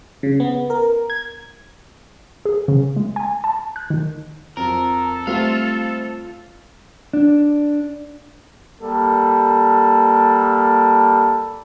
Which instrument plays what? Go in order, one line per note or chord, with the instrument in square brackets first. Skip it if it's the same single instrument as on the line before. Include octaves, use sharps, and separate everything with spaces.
[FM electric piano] C#3
B3
A#4
G#6
[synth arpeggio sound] G#4
C#3
G#3
G#5
A5
F#6
D#3
[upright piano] F2 F3 [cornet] A4 [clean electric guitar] A#4
[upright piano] G3 A3 C4 [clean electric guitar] F4 F5
[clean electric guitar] D4
[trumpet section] G3 A#3 A4